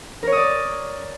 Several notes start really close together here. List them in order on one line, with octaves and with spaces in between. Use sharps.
A#4 C#5 D#6 D5